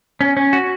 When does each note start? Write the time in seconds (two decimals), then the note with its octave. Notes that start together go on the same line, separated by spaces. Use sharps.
0.21 C#4
0.37 C#4
0.53 F#4